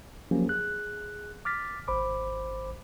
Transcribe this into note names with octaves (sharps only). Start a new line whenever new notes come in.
F3 F#3 A#3 C#4 G4
G#4 F#6
D6 F6 A6 B6
G#1 C5 B5 D6